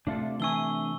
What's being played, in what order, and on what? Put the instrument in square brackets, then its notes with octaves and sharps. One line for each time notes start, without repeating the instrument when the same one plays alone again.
[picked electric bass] C3 A3 [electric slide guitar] D4 F4 A4
[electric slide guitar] E3 D4 G#5 [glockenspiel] C#6 E6 G7